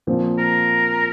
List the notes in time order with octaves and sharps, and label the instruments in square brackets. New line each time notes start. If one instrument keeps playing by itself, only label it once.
[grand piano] A#2 F3 C4
[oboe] A#4